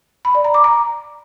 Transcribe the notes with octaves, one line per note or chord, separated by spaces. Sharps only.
B5
D5
A#5
D6
A#5